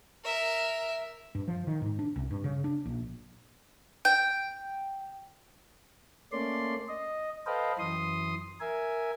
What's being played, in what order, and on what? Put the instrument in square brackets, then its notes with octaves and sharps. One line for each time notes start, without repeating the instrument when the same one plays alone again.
[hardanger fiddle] A#4 E5
[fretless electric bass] G2
F3
D#3
G#2
D4
C2
G2
C#3
D4
A#1
[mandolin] G5
[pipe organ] A3 A#3 C#4 D5 C6
D#5
A4 B4 C5 D#5 F5 G5
F#2 E3 C6 D#6
A#4 E5 G#5